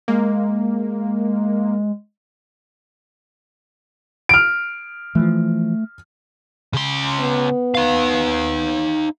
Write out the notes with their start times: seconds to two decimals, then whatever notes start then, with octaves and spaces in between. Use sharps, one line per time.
0.08 G#3 A#3
4.29 F6 D7
5.15 E3 F3 A3
6.74 C#3 C6
7.20 B3
7.75 D#4 F5